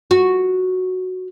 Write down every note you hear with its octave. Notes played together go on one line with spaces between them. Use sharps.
F#4